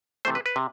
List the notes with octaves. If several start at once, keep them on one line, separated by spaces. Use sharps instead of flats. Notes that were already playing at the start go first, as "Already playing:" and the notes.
C3 E3 A3 C5
B4
B4
C3